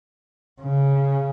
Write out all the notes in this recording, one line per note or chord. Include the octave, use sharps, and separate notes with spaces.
C#3